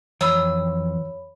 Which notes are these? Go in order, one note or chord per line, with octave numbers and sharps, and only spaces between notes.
F2 E3 C#5 B5 D#6 E6